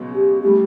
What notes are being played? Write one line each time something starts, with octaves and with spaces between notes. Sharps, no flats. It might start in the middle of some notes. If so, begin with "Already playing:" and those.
Already playing: C#2 B2 F#3 B3
G4
A2 G3 G4